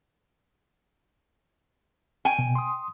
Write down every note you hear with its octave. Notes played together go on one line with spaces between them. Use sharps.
G5 G#5
B2
C6 D#6